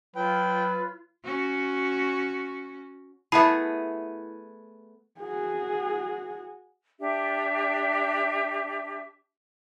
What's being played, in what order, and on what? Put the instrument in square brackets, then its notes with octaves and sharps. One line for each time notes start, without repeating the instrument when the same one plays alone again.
[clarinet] F#3 [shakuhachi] F4 [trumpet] B4 [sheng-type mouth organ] G5
[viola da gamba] C#4 F#4
[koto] A3 B3 G#4 [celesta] E4 E5 [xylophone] A5 B5 C7
[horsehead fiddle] F#4 G#4
[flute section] D4 G4 E5